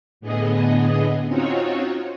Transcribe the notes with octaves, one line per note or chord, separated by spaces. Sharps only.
A2 D3 B3 G#4 D#5
C4 C#4 D#4 F4 F#4 C#5